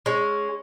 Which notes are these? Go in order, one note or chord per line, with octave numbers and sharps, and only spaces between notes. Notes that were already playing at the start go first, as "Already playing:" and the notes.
G#3 C#4